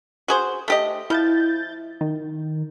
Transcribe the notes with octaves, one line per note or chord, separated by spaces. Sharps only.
F#4 G#4 C5
A3 G4 D#5
F3 E4 G6 A6
D#3